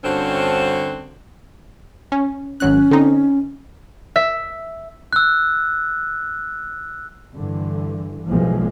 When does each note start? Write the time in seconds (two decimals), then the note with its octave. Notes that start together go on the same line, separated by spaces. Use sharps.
0.04 G2 D3 C4 C#4 F#4 C5
2.12 C#4
2.60 G#1 F#3 C#4 F#6
2.91 D3 C4 D#4
4.16 E5
5.13 E6 F#6
7.33 G2 D3 E3
8.27 B1 E3 F3 G#3 A#3